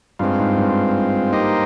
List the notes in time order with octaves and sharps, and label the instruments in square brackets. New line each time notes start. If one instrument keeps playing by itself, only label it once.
[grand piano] G2 [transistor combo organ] G#3 C4 F4
[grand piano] G#2
G2
[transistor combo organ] A#3 D#4 G4 C5 D#5